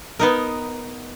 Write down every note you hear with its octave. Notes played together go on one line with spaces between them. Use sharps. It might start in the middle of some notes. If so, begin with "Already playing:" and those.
B3 D#4 A#4